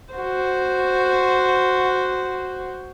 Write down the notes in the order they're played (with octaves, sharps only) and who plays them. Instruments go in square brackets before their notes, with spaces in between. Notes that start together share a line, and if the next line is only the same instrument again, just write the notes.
[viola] F#4 C5